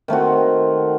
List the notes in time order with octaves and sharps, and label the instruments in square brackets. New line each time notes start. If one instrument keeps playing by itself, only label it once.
[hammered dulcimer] D#3 A3 C4 F#4